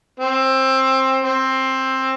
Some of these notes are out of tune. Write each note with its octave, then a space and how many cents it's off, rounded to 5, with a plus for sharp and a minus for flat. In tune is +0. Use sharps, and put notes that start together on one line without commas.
C4 +20
C4 +15